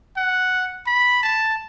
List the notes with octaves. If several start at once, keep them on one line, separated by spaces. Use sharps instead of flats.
F#5
B5
A5